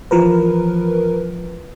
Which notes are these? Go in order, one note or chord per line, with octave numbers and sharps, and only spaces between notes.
E3 F3 A#4 B4